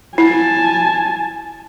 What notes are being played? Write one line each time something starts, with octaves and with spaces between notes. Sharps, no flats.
E4 G#5 A5